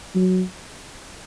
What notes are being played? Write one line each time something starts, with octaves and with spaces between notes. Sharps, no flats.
F#3